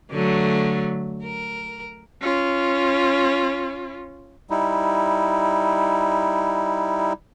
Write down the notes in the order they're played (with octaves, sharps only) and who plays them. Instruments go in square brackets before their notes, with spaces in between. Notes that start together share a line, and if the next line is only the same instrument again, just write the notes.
[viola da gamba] D3 F#3 A3
A#4
[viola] C#4 F4
[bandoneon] G3 D#4 E4